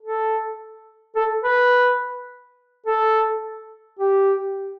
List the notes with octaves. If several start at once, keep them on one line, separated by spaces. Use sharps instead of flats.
A4
A4
B4
A4
G4